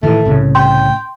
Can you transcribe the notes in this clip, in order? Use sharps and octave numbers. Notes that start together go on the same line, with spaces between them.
A2 D#3 E3 A3
C2 A2 C#3
G5 C6